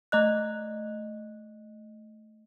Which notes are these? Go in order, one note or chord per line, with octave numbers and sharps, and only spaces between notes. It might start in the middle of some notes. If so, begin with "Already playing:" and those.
A3 D#5 F#6